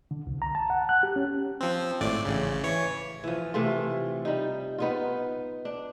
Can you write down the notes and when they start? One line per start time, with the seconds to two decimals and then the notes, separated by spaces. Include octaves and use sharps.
0.11 D3
0.27 C2
0.42 A#5
0.55 A5
0.70 F#5
0.89 F#6
1.03 G4
1.16 C#4
1.61 F3 C4
2.01 G#1 A2 D5
2.25 A1 C#3
2.63 E3 C#5
3.24 E3 F3
3.54 C3 E3 A3 F4
4.25 G3 D#4
4.78 B3 D#4 F4
5.65 D4